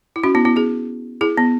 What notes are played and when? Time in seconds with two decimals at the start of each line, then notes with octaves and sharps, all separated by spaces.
0.16 E4
0.23 C#4 F#4
0.35 B3 E4
0.45 B3 E4
0.56 E4 G#4
1.21 E4 G#4
1.37 B3